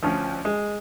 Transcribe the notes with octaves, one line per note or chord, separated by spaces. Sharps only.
D2 F3 C#4
G#3